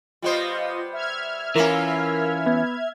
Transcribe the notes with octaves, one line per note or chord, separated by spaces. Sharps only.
G3 B3 F4 C5 D#5
E5 F6 G#6
E3 A#3 C#4 E4 F4 A#4
B3